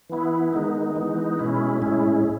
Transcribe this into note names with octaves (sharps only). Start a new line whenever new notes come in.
E3 B3 E4
D#3 G#3 B3 D#4
E3 G#3 B3 D#4
B2 G#3 C#4 E4
A2 G#3 C#4 E4